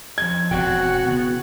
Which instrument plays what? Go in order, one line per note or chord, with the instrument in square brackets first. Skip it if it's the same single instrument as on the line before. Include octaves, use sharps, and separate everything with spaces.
[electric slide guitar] F3 D#5 [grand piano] G#6
[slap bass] E1 B2 [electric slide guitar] C4 D5 G5 [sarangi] F#4
[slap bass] C#3 E3 [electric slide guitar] B3